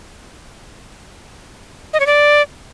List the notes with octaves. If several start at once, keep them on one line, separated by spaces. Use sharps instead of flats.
D#5
C#5
D5